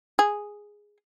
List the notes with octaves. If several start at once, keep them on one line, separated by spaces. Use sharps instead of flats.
G#4